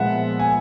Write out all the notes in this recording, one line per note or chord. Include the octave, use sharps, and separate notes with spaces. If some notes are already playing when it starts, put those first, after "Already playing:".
Already playing: A#2 F3 G#3 B3 E5 F#5
G#5